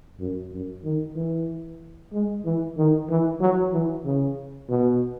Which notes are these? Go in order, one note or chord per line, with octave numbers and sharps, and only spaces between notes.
F#2
F#2
D#3
E3
G#3
E3
D#3
E3
F#3
E3
C#3
B2